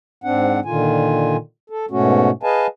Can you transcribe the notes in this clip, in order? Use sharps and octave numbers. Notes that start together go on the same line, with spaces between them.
G#2 C4 D4 F#5
A#2 D3 D#3 F4 G#5
A4
G#2 B2 A3 C#4 F#4
G#4 B4 D#5 F5 G#5 A5